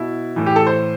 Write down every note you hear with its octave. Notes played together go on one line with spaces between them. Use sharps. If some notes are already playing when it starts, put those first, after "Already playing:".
Already playing: B2 E4
A2 E3
G4
A4
C5